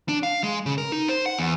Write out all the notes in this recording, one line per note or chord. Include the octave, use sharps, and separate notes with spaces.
D4
F5
G#3
C#3
A#4
D#4
C5
F#5
E2